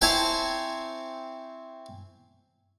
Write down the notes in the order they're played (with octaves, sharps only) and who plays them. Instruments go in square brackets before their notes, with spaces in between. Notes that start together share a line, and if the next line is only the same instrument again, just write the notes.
[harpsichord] C4 E4 C5 C#5 G#5 A5